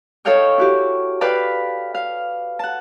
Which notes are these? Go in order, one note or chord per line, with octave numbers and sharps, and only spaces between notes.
D#4 A4 C#5 F5 G5 C#6
E4 F#4 G4
B4 D5 F5 G5 A5 B5
F5
F#5 A5